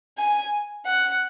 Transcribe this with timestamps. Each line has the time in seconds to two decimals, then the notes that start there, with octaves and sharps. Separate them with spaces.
0.18 G#5
0.86 F#5